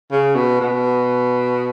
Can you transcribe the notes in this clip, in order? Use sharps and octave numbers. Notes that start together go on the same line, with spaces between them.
C#3
B2
B2